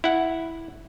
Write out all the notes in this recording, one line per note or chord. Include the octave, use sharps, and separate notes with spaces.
E4 F#5